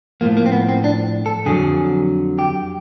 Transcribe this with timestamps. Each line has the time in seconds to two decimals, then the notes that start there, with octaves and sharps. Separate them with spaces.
0.21 A2 F3 A#3
0.37 A#3
0.46 C4
0.52 B3
0.69 C4
0.84 D4
1.26 A4
1.46 F2 D3 F#3 G#4
2.39 G4